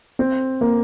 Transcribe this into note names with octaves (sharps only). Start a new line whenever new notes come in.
C4
A#3